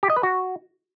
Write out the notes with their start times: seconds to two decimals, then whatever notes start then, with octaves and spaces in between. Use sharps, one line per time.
0.03 G4
0.10 D#5
0.16 B4
0.23 F#4